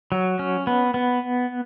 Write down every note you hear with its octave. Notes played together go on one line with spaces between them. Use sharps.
F#3
C#4
B3
B3